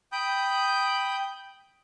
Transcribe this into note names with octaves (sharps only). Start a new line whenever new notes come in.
G5 B5 D#6 G6